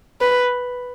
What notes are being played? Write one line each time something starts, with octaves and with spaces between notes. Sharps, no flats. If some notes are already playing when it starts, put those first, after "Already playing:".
B4